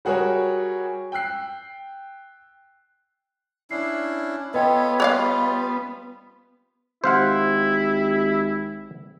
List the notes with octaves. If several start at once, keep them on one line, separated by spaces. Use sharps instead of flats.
G3 F#4 G#4 A#4 C#5
G5 E6 F#6 C7
C#4 D4 E4 C7
B3 F4 A4 B4 C#5 D#5 G5
G3 F4 C#5 D5 F5
G#1 E4 G4 C5 F5 F#5